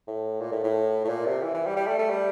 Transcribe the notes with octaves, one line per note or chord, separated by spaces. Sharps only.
A2
A#2
A2
A2
A2
A#2
C3
E3
E3
G3
G3
A3
A3
G3